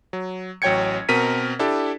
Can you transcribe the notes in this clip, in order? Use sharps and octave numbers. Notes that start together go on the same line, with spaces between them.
F#3
A1 F#3 C#5 G5 G#6 C#7
B2 C4 A#4 A#5 B6 D#7
D4 E4 G4 A4